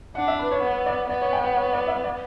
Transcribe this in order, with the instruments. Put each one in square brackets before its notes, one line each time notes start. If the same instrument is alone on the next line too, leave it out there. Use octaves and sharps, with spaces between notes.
[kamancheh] D4 [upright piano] F#5
[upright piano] E5
B4
C#5
[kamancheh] B3 [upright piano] C#5
[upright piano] D5
[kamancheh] B3 [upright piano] D5
[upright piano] C#5
G5
F#5
C#5
D5
E5
D5